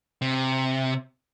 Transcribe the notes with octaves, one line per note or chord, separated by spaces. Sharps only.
C3